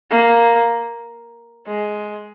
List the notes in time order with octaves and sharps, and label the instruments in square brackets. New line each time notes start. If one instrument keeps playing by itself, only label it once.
[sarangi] A#3
G#3